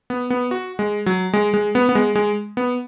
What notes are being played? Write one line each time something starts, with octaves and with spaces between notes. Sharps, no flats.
B3
B3
F#4
G#3
F#3
G#3
G#3
B3
B3
G#3
G#3
B3